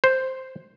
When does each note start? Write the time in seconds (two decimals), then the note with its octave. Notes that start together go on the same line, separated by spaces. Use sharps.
0.04 C5